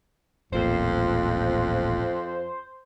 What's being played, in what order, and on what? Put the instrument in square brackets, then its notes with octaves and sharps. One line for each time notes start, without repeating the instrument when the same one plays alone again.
[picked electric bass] D#1 A1 A#2 [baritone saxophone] F2 [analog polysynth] C5